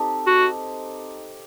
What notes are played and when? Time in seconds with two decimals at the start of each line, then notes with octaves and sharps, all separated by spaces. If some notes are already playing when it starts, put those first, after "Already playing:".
Already playing: C4 D#4 G4 A4
0.27 F#4